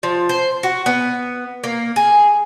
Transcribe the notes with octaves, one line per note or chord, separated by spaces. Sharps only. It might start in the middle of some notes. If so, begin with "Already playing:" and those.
F3
C5
F#4
B3
A#3
G#4